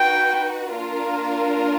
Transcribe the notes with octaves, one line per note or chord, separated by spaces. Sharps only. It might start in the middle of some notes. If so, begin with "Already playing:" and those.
Already playing: D#4 F#4 B4 G5
A#3 D4 F4 A#4